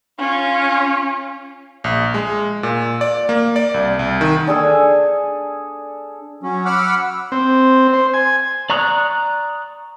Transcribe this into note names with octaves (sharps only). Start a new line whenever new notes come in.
C#4 F4
A#1
G#3
A#2
D5
A#3
D5
C2
C2
D#3
D4 G#4 A4 G#5
F#3 C#4
F#5 B5 D6 E6 F6
C4
C5
G#5
D5 A#5 C#6 D#6 F#6